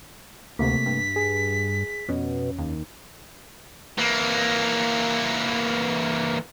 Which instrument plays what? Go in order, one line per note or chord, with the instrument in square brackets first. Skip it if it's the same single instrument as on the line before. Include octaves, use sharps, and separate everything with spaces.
[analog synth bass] D2 [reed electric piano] C3 A3 A#3 [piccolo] B6
[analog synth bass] G2
[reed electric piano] G#4
[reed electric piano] F2 C#4 [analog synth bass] B2
[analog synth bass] D#2
[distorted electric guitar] E3 A#3